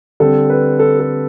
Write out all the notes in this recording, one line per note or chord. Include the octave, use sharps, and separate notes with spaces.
D3 G3 C4 A4
B4
A4
A4